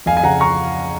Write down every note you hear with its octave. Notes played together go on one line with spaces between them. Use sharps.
F2 F5 G#5
G#5
C#3 F#5 A#5
A#5 C#6